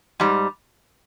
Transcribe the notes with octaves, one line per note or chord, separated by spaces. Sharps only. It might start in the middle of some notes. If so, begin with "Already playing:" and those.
G#2 G3